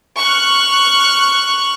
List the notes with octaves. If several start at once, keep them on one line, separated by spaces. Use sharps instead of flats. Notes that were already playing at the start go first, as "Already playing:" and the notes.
C#6 F6 F#6